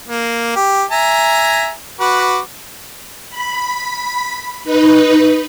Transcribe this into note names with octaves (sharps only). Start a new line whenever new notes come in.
A#3
G4
E5 G#5 A#5
F#4 B4 D6
B5
D#4 B4